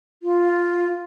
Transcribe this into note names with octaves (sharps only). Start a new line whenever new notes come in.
F4